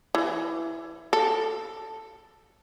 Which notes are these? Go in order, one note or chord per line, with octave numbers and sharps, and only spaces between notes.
E3
A4